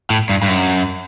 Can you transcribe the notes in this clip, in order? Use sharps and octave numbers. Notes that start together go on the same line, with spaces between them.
A2
G2
G2
F#2